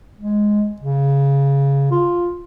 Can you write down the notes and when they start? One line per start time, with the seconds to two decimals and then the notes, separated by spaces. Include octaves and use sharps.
0.19 G#3
0.81 C#3
1.91 F4